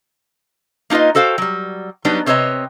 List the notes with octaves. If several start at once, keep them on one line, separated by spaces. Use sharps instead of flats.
A#3 D#4 F4 B4 D#5
F#4 A4 C5 F5 G5
F#3 G3
F#3 G3 B3 D4 D#4
C3 C4 B4 C#5 D#5 A#5